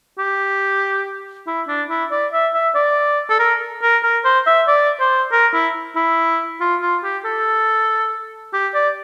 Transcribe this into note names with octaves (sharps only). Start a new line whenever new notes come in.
G4
E4
D4
E4
D5
E5
E5
D5
A4
A#4
A#4
A#4
C5
E5
D5
C5
A#4
E4
E4
F4
F4
G4
A4
G4
D5